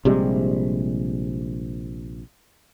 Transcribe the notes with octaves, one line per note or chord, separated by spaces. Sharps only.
A#1 C3 G3 G#3